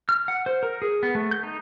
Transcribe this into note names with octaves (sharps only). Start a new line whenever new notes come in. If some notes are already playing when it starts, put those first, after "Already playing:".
F6
F#5
C5
A#4
G#4
B3
A3
G6
D#4